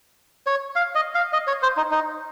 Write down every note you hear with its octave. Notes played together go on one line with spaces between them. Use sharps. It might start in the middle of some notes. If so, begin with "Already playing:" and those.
C#5
F5
D#5
F5
D#5
C#5
C5
D#4
D#4